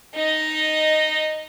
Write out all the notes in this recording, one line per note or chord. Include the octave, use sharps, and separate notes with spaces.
D#4 D#5